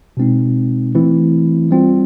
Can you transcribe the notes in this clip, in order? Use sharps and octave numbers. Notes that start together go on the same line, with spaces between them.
B2 G#3 C4 D#4
E3 A3 C4 E4
G3 C4 F4